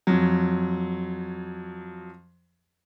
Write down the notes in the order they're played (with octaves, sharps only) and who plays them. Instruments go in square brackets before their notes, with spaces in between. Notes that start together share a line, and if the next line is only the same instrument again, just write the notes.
[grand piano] F2 F#3